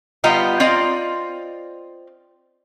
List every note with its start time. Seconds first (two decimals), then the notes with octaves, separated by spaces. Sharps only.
0.24 G3 B3 F4 D#5 G5 A#5
0.60 C4 F4 D5 D#5